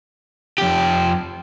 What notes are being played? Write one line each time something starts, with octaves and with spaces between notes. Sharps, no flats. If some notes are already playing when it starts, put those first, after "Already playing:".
F2 G4